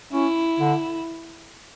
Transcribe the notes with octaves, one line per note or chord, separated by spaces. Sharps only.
C#4 E4
D3